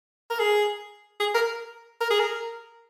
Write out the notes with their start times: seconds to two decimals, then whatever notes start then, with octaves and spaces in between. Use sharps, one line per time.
0.30 A#4
0.39 G#4
1.20 G#4
1.34 A#4
2.01 A#4
2.10 G#4
2.19 A#4